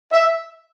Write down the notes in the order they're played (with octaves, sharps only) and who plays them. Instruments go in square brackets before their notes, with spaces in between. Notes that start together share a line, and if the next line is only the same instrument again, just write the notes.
[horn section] E5